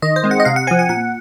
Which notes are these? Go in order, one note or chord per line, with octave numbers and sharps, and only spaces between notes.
D#3 D#5
C5
G#3 C4
F#5
D#5
C3 F5
F#5
F3 C4 G#5
F#5
A#2 F#5